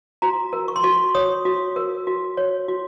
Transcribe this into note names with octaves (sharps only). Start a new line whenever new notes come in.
F#4 A#5
A#4
C#6
C6
F#4 C#6
C#5 D#6
F#4
A#4
F#4
C#5
F#4